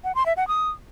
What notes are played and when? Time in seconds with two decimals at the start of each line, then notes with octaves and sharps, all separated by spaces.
0.04 F#5
0.15 C6
0.26 E5
0.37 F#5
0.48 D#6